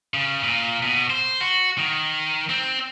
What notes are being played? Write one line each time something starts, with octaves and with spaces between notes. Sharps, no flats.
C#3
A#2
B2
C5
F#4
D#3
C4